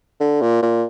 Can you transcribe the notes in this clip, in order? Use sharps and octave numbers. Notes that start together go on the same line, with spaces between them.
D3
A#2
A#2